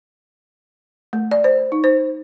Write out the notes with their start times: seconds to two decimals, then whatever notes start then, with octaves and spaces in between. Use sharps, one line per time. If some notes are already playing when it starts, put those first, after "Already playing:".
1.13 A3
1.31 D5
1.44 C5
1.72 D#4
1.84 C5